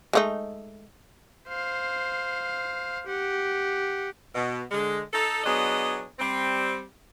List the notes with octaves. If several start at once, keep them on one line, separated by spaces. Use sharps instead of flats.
G#3 A3 D#4
C5 F5
G4 F#5
B2
D3 G#3
D#4 A4
F#3 B3 D4 G#4 D#5
G3 C4